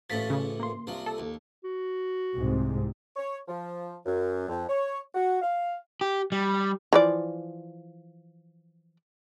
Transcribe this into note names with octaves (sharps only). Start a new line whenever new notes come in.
A1 A2 F3 A6 B6
C#3
A#3 C6
C2 F3
A4
D#2
F#4
C2 G#2 C3
C#5
F3
F#2
F2
C#5
F#4
F5
G4
G3
E3 F3 D5